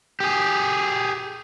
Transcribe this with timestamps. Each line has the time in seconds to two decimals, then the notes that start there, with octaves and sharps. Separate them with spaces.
0.20 G4 G#4